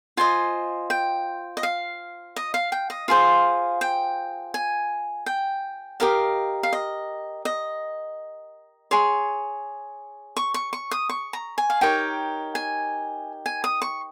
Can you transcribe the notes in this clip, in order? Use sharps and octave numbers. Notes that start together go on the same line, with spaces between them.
F4 C5 D#5 G#5
G5
D#5
F5
D#5
F5
G5
D#5
F4 G#4 C5 F5
G5
G#5
G5
G4 A#4 D#5 F5
F5
D#5
D#5
G#4 C#5 C6
C#6
C#6
C#6
D#6
C#6
A#5
G#5
F5
D#4 G4 A#4 C#5 G5
G#5
G#5
D#6
C#6